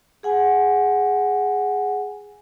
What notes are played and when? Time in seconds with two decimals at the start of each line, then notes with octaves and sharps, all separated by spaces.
0.23 G#4 F#5 G#5